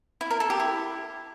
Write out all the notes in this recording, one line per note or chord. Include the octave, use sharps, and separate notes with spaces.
E4
A#4
A4
G4
E4